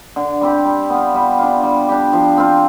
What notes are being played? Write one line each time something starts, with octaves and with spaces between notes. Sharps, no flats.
D3
G3 C4 G4
G3
B3 F4
G3
D4 F4
G3
D4 G4
F3
C4 F4